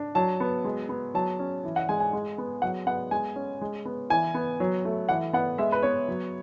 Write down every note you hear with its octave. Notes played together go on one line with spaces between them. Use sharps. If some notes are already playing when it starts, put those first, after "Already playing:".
Already playing: D4
F#3 A5
B3
G#3
B3
F#3 A5
C#4
E3
F#5
G#3 G#5
G#5
G#3
B3
F#3 F#5
B3 F#5
G#3 G#5
C#4
G#3
B3
E3 G#5
B3
F#3
A3
E3 F#5
B3 F#5
G#3 E5
B4
B3 C#5
F#3